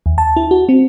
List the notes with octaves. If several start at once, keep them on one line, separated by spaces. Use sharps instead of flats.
D#2
A5
E4
F#4
C4